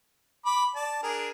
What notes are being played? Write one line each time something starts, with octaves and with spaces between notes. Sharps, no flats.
B5 D6
D5 A5
D4 G#4 A#4